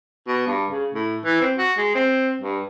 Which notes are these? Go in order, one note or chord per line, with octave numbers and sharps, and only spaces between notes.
B2
G2
C#3
A2
E3
C4
F#4
G#3
C4
G2